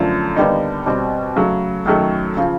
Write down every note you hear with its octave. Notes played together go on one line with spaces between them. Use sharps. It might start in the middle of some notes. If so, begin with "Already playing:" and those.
Already playing: F#2 D3 F3 A3
D#2 D3 G3 B3 D#4
B2 G3 C4
C#3 F#3 A3
F#2 D#3 F#3 A3
C#3 F3